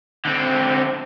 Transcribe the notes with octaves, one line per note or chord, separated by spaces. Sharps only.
D3 C4